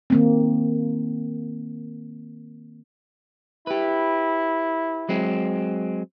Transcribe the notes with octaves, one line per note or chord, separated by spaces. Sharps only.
D#3 A#3 C4
E4 G4 B4
F#3 G#3 C4